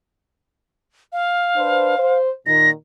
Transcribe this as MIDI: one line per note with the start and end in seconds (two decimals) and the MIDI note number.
1.12 2.18 77
1.56 1.94 62
1.56 1.94 71
1.56 1.94 72
1.98 2.31 72
2.46 2.71 46
2.46 2.71 51
2.46 2.70 94